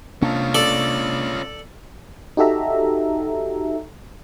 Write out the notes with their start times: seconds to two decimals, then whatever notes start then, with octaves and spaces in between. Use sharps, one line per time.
0.22 C3 A#3 C#4 D4 F4
0.55 A4 D5
2.37 D#4 F#4 G4 A4 E5 A#5